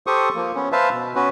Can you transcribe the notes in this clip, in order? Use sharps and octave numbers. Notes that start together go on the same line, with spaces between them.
G4 A4 C5 C#6 D#6
F3 A#3
B3 C#4
B4 C5 E5 F5 A5
B2
B3 C#4 F#4 B4